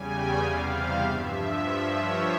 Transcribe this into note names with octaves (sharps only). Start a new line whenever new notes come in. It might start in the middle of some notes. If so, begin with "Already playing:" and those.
Already playing: E2 C#3 G3 G#5
G5
E2 C3 G3 F5
G2 F3 E5
G2 F3
C#5